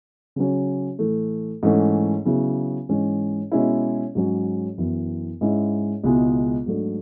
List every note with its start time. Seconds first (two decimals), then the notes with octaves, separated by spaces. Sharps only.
0.36 C#3 F#3 C#4
0.99 A2 E3 A3
1.63 G#2 E3 A3 C#4
2.25 C#3 F#3 B3 E4
2.89 G#2 E3 G#3 C#4
3.52 B2 G#3 C#4 E4
4.15 G#2 F#3 C#4
4.78 F#2 E3 B3 E4
5.41 G#2 G#3 C#4 E4
6.04 C#2 B2 G#3 B3 E4
6.66 G#2 F#3 A3 D4